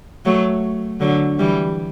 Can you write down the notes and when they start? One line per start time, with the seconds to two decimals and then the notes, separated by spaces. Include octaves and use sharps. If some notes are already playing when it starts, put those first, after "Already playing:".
0.25 F#3 A3
1.01 D3 F#3
1.39 E3 G3